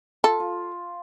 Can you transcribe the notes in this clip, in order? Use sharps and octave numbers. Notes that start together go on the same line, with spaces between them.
F4 A4
F4